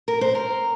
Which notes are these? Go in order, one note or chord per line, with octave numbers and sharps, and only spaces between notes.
A#4
C5
A#4